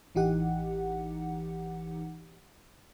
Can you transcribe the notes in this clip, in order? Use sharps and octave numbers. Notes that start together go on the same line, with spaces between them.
A1 E3 D#4 G4 F#5